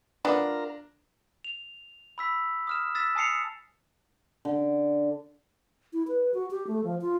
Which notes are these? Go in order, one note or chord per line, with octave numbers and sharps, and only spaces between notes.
B3 D4 F4 A#4 A#5
F7
B5 E6 B6
D#6 F6 E7
E6 A6 B6 E7
G#5 A5 D#6 C7 C#7 F7
D3
E4
B4
F#4
G4
A3
F3
F4